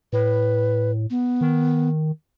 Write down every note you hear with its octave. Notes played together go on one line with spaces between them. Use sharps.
A2 B4
B3
D#3